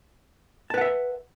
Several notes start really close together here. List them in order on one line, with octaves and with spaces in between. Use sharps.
A5 B4 F#5 E5